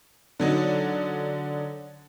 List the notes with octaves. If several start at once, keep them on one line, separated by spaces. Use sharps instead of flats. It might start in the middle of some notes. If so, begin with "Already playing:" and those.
D3 F#3 D#4